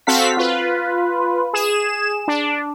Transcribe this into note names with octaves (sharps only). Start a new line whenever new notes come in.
C4 F#4 A4 F5 B6
F4 B4
G#4 E7
D4